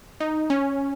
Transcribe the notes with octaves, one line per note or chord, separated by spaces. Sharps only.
D#4
C#4